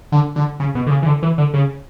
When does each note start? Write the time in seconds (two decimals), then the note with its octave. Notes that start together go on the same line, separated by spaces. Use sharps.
0.12 D3
0.36 D3
0.60 C#3
0.75 B2
0.87 D3
0.90 C#3
1.02 E3
1.06 D3
1.22 E3
1.38 D3
1.54 C#3